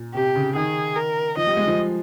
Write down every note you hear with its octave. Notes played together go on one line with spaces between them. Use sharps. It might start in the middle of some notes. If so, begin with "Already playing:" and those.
Already playing: A#2
C3 G4
C#3
D#3 G#4
A#4
F3 D#5
G3
G#3
F3